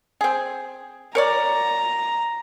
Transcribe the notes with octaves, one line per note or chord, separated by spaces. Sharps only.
C4 G#4
A#4 C#5 D5 A#5